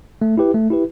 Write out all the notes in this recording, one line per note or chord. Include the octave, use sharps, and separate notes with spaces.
A3
E4 G4 B4
A3
E4 G4 B4